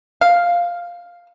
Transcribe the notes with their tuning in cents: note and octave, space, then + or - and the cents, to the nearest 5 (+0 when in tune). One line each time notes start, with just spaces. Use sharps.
F5 +0